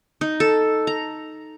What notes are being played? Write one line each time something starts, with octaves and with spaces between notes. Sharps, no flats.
D#4
A4
A#5